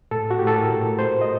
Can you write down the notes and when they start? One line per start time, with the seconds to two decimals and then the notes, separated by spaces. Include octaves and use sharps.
0.11 A2 A4
0.31 F#4
0.39 A2 G4
0.47 A4
0.56 A#4
0.69 A2
0.99 A3 C5
1.21 D#5